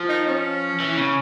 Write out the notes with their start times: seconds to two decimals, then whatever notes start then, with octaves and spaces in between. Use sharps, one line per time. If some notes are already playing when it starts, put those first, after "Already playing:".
Already playing: F3
0.09 D#4
0.27 C#4
0.80 E3
0.97 C#3